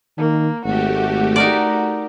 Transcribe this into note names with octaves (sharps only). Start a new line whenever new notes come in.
D#3 A#3
G#1 A3 F#4 G4
D#4 A#4 D5